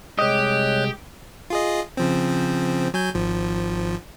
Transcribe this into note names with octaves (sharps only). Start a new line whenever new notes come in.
C2 G#3 G4 C#5 D#5 F#6 G6
F4 G#4 D#5
C#3 F3 C4
F#3 G#5 G6
G#1 F3